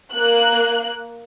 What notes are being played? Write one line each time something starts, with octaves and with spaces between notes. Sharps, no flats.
A#3 F#6